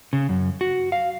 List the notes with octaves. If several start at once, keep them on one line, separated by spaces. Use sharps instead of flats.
C#3
F#2
F#4
F5